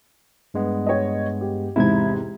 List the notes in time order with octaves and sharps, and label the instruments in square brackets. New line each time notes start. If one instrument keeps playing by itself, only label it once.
[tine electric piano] G2 G#3 B3
[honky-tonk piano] C#5 D#5
G4
[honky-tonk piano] E2 G#2 C3 [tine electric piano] E4 G#6